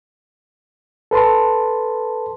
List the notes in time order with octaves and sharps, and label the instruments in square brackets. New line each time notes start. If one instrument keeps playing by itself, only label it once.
[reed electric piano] A4 B4 A5 C6